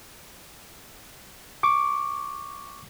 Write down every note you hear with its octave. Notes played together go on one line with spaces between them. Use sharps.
C#6 D6